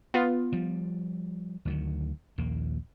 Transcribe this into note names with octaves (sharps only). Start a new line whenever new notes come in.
B3 F4
F3 G3
D2 D#3 F#3
A#1 D#2 A#3